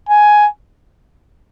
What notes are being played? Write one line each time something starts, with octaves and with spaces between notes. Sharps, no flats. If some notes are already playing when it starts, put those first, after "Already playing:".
G#5